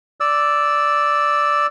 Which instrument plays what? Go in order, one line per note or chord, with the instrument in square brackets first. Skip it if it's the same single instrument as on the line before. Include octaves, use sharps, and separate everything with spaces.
[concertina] D5 E6